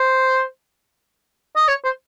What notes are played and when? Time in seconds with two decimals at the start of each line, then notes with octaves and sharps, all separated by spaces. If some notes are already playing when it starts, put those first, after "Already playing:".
Already playing: C5
1.56 D#5
1.68 C#5
1.84 C5